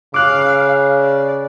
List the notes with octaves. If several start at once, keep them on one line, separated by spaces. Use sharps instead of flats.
C#3 F5 D6 F#6
D5